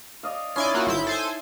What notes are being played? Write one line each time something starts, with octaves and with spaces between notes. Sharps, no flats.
D5 D#5 F5
C#4 D#4 E4 D5 G#5 C6
A#3 F4 F#4 C6
G#1 E4 G6
A4 C5 G#5